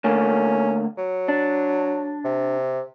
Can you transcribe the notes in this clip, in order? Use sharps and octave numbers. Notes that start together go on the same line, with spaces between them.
D3 A3 A#3 C#4
F#3
D4
C3